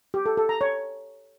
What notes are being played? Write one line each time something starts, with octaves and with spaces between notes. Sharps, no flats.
G4
A4
A4
A#5
C#5